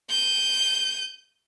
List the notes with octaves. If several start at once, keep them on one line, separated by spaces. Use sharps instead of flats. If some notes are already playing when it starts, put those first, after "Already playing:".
G6 D#7